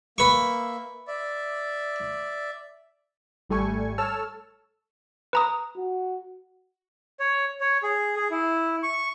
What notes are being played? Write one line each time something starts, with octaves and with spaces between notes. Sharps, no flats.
A#3 B4 E5 C#6
D5 E5
G#1 G3 A3 G#5 C#6
A4 C#5 A5 E6 F6
B4 A#5 D#6
F#4
C#5
C#5
G#4
G#4
E4
C#6